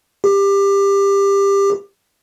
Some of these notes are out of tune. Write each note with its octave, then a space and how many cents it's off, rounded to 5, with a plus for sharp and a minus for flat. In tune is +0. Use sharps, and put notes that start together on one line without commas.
G4 +20